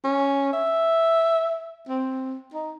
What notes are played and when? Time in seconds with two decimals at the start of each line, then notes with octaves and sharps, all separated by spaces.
0.04 C#4
0.53 E5
1.89 C4
2.54 D#4